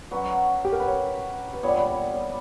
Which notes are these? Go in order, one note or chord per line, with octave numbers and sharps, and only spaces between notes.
F#3 C#4 F#4 B4
G4
A#4
B4
C#5
B4
A#2 G3 B3 D4 C#5
D5
C#5